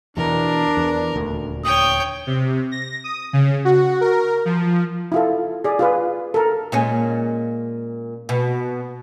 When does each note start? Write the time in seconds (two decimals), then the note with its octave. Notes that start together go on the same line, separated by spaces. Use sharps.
0.17 E2 B2 E3 D4 A#4
0.77 E2
1.16 D#1 D2
1.65 C#5 G5 D#6
2.27 C3
2.71 A#6
3.04 D#6
3.33 C#3
3.65 F#4
4.01 A#4
4.45 F3
5.12 E4 F4 A4
5.64 G#4 D5
5.79 F4 G#4 B4
6.34 A4 A#4
6.72 A#2 G#3 C#4
8.29 B2